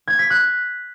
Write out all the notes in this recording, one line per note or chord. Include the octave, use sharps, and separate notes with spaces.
G#6
B6
F#6